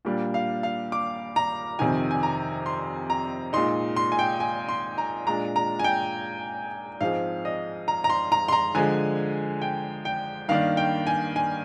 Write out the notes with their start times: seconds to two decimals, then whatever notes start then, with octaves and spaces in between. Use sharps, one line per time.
0.05 A#2 G3 A#3 D4
0.34 F5
0.63 F5
0.92 D6
1.36 A#5
1.79 F2 C3 D#3 G#5
2.11 G#5
2.23 A#5
2.66 C6
3.10 A#5
3.53 A#2 G#3 D#4 C6
3.96 C6
4.12 G#5
4.19 G5
4.40 G#5
4.69 C6
4.98 A#5
5.27 A#2 G#3 D4 A#5
5.56 A#5
5.79 G#5
5.84 G5
7.01 G#2 F3 G#3 C4 F5
7.45 D#5
7.88 A#5
8.04 A#5
8.10 C6
8.32 A#5
8.48 C6
8.52 A#5
8.75 D3 F3 G#3 G#5
9.62 G5
10.05 G5
10.48 G2 D#3 A#3 D4 F5
10.77 G5
11.07 G#5
11.36 G#5